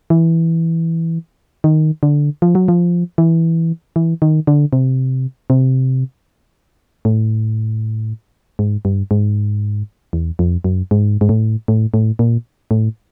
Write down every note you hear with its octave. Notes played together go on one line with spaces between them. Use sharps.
E3
D#3
D3
F3
F#3
F3
E3
E3
D#3
D3
C3
C3
A2
G#2
G2
G#2
E2
F2
F#2
G#2
G#2
A2
A2
A2
A#2
A2